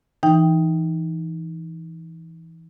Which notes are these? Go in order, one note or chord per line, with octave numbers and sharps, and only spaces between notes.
E3 D#4 G5